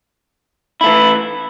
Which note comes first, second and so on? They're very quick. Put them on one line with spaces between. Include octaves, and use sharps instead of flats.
E4 A3 E3